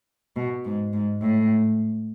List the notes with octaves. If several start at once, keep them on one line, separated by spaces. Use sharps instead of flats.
B2
G#2
G#2
A2